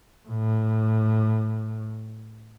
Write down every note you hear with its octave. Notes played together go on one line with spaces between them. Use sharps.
A2